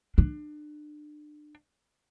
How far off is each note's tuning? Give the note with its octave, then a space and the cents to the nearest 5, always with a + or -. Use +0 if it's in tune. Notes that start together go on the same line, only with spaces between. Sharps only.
D4 +30